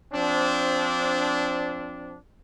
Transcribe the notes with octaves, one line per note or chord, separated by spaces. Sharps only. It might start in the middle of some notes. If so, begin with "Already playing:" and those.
F3 C4 D4